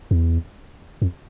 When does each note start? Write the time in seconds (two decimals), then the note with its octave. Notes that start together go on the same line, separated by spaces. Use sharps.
0.11 E2
1.02 F2